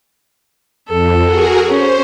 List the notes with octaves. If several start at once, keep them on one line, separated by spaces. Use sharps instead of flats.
F2 A4
F#4 G#4 A#4
C#4 C5